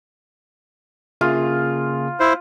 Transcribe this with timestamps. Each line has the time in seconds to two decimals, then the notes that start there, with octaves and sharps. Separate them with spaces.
1.21 C#3 A#3 F4 G#4
2.20 E4 C5